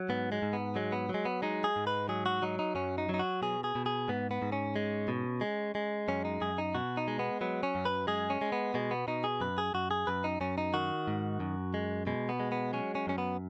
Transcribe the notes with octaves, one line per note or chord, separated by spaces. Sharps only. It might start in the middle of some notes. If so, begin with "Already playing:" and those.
Already playing: F#3
G#2 B3
G#3
G#2
B3
F#3 G#3
B3
F#3
G#3
B3
G#3 D#4
G#4
G#2
B4
F#3 G#4
F#4
F#3 D#4
D#4
F#2 C#4
D#4
F#3 D#4
F#4
B2 G#4
G#4
B2
G#4
G#2 B3
B3
G#2
C#4
G#3
B2
G#3
G#3
F#2 C#4
D#4
F#2 G#4
D#4
B2 F#4
D#4
G#3
B3
F#3 B3
C#4
F#2
B4
G#3 G#4
C#4
G#3
B3
B2 G#3
B3
B2 D#4
G#4
F#2 B4
G#4
F#2 F#4
G#4
F#2 B4
D#4
F#2 C#4
D#4
D#3 F#4
G#2
F#2
G#3
B2 G#3
B3
G#3
B3
F#3 C#4
C#4
F#2 C#4
B3